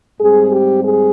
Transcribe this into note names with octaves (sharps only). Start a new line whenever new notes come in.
G#2 G3 C4 G#4
G4
G#4